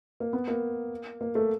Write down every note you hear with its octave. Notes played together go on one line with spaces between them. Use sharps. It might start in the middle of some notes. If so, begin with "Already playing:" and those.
A#3
B3
A#3
A#3
A3